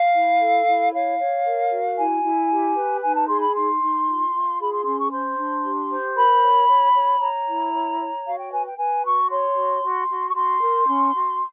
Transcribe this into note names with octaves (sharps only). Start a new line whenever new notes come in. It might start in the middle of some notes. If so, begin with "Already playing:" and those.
Already playing: F5
E4
A4
E4
C#5 F5
C#5
A#4
F#4
E4 G#5
E4
G4
B4
D#4 G#5
A5
G#4 C6
B5
D#4 C6
D#4
F4
F4
G#4 B5
C6
C#4 C6
C#6
C5 C6
D4
G4
C5
A#4 B5
C#5
C#5
C#5
C#5 A#5
E4
C#5
C#5
F#4 F5
G5
B4 G#5
G5
B4 G#5
F#4 C#6
C#5 C6
F#4
F#4
F#4
C#6
F#4 C6
A#4
C#4
F#4